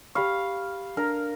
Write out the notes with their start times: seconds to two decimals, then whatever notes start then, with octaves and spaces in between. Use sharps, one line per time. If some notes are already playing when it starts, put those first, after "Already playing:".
0.15 G4 F5 B5 C#6
0.97 D4 A#4